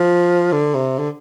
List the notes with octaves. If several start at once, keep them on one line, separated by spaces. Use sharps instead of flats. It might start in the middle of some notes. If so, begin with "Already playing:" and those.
Already playing: F3
D3
C3
D3